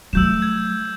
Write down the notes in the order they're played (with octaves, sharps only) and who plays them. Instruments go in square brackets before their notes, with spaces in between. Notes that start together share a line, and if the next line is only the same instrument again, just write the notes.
[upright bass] F#3 A3 [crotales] E6 G6 E7
[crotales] G#6